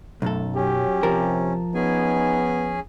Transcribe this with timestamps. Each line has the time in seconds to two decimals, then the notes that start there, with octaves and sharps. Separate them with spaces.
0.22 B1 F#2 A3 A4
0.55 F#3 C#4 G4
1.03 C3 F3 A#4
1.75 B3 C#4 D#4 G#4 G#5